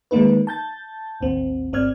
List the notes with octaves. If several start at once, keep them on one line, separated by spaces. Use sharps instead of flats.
D#3 G#3 A#3 D#4 B4
A5 G6 A6
A1 D#2 C4
G1 C4 D5 F6 G#6